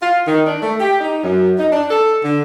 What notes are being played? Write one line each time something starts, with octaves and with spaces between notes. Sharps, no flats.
F4
D#3
D4
A3
G4
D#4
F#2
D#4
D4
A4
D3